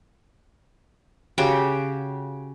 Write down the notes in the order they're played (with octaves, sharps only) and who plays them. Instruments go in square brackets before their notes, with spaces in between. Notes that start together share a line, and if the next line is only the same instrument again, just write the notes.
[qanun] C#3 F#4 G4 G5